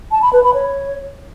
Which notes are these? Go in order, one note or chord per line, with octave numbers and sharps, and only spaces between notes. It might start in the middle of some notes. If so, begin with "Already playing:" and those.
A5
B5
B4
B5
C#5